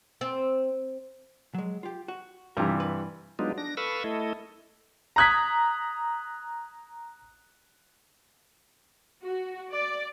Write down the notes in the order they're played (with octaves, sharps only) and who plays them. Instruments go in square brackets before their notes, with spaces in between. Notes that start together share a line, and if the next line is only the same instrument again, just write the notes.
[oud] C4
[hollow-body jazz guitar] F#3 G#3
F4 G4
F#4
[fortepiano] G2 C3 E3 [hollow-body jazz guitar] G3 F4 A#4
[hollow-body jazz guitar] B4
[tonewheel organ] F#3 G#3 B3 D4 D#4 F4
D4 A#6
A4 B4 F5 B5 C#6 E6
A3 E4 A4 D#5
[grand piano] A#5 D#6 F#6 G#6 B6
[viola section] F#4
D5